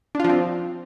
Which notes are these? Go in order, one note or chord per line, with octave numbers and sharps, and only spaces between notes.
F3 C4 D4 F4